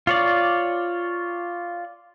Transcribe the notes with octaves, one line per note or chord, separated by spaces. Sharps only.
F4 C#5 D5